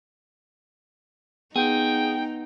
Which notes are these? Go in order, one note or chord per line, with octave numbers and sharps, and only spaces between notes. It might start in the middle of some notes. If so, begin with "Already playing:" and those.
B3 D#4 G#4 G5